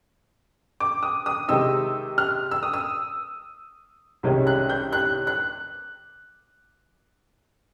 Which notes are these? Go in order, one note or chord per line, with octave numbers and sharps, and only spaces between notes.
D6
D#6
D#6
C3 D#3 G#3 C4 D#4 E6
F6
E6
D#6
E6
C2 C3 D#3 G#3 C#4
F#6
G6
F#6
F#6